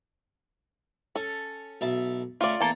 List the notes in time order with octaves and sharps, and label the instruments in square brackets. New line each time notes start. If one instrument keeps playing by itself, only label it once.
[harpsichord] C#4 [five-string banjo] A4
[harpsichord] B1 E5 A5
[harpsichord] C#3 A3 C#4 [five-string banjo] F4 D5
[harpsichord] E2 [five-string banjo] A#3 A4 A5